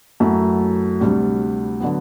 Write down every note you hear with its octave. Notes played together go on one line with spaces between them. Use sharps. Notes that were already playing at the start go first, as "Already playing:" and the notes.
F#2 F#3 A3 E4
D2 C3 G3 D4
D3 F#3 B3